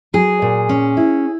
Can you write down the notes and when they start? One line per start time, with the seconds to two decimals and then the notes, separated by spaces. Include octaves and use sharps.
0.13 F#3 G#4
0.42 A#2
0.69 C#4
0.97 E4